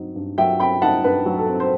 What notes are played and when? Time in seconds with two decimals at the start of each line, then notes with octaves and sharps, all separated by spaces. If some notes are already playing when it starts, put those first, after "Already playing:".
Already playing: G2 F#3 C4 D#4
0.16 G2
0.38 F#3 E5 G5
0.59 C4 G5 B5
0.82 D#4 F#5 A5
1.04 G2 B4
1.26 F#3
1.38 A4
1.48 C4
1.60 C5